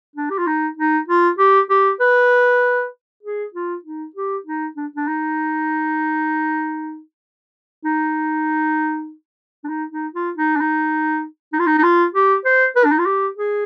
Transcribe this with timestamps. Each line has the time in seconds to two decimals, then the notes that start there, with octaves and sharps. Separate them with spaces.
0.16 D4
0.30 G4
0.38 F4
0.47 D#4
0.77 D#4
1.08 F4
1.39 G4
1.70 G4
2.00 B4
3.23 G#4
3.54 F4
3.84 D#4
4.15 G4
4.46 D#4
4.77 D4
4.96 D4
5.07 D#4
7.84 D#4
9.64 D4
9.69 D#4
9.91 D#4
10.14 F4
10.37 D#4
10.56 D4
10.60 D#4
11.53 D#4
11.59 F4
11.66 D#4
11.78 D#4
11.83 F4
12.14 G4
12.45 C5
12.76 B4
12.84 D4
12.92 D#4
12.99 F4
13.06 G4
13.37 G#4